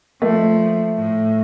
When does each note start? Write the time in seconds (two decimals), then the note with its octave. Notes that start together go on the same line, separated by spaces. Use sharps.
0.22 F3 A3
0.97 A2